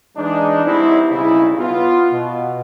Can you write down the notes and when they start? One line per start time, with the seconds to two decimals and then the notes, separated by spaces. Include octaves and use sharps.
0.17 E3 G#3 D4 D#4
0.65 G3 B3 C4 D#4 E4
1.09 B1 C#3 G3 D#4 E4
1.58 B3 F4
2.12 B2